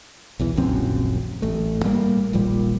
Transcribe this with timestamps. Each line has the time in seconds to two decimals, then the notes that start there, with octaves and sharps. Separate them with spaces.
0.39 B1 E2 E3
0.56 D#1 A#1 F#2 C4
1.42 A1 A3
1.84 A2 G3 A#3
2.33 D#1 A#1 A#2 G3